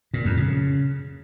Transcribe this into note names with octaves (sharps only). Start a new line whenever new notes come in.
A#2
F2
C#3